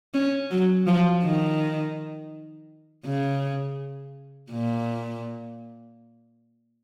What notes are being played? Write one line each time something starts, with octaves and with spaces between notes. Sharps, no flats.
C#4
F#3
F3
D#3
C#3
A#2